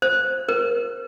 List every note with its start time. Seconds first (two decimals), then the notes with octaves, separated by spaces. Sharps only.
0.02 C5
0.49 A#4